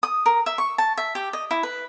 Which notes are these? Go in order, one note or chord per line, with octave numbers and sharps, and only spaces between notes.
D#6
A#4
E5
C#6
A5
E5
G4
D#5
E4
B4